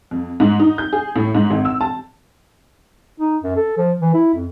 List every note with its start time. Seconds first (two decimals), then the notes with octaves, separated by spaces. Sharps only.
0.11 F2
0.40 G#2
0.60 D#4
0.78 G6
0.93 G#4
1.16 A2
1.35 G#2
1.50 G#1
1.65 E6
1.81 A5
3.20 D#4
3.43 F#2
3.56 A4
3.78 F3
4.01 E3
4.14 E4
4.34 F2